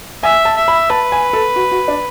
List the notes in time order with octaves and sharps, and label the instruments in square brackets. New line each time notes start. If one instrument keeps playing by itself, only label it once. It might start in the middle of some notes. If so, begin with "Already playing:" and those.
[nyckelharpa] E5 [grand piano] G#5
[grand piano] A5
[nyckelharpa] E5
[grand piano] B5
[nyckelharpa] B4 [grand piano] A5
[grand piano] G#5
A4
F#4
F#4
D4